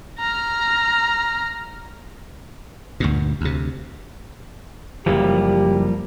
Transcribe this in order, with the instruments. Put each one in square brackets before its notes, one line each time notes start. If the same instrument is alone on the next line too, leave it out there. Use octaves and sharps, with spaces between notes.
[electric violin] A#5 F6
[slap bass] D2 G2 A#2
D2 C3
[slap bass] F#1 F#2 E3 [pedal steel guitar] F3 G3 A#3 [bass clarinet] G4